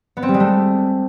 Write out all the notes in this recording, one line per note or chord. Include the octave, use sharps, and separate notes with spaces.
B3
C4
G3
G#3
A3